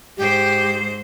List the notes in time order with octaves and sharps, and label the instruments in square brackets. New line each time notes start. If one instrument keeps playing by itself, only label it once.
[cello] G#2 C5 [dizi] G4